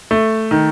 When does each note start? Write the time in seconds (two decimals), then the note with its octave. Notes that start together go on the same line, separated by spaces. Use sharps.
0.11 A3
0.51 D#3